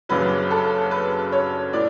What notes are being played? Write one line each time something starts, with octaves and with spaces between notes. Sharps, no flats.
F#1 F#2 C#3 F#3 B4
A4
B4
C#5
A2 D5